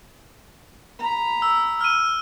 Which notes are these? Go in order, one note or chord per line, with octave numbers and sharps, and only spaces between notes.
A#5 B5
E6
F6 D#7